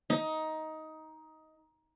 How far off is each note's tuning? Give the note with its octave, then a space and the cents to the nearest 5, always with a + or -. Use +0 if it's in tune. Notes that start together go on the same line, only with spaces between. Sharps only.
D#4 +15